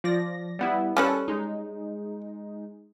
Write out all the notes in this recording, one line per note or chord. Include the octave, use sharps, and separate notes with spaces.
F3 D5 A#6
G3 B3 E4
G3 C#4 A4 B4
G#3 D#4